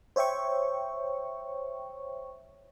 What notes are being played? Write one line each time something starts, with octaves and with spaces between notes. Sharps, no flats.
C5 C#5 E5 G5 C#6